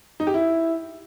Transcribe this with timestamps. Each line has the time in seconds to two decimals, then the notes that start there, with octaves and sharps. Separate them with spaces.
0.20 D#4
0.27 G4
0.34 E4